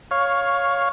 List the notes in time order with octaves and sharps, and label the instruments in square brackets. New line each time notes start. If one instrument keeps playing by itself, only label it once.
[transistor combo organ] C#5 F5